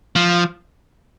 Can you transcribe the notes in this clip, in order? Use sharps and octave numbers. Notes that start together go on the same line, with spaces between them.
F3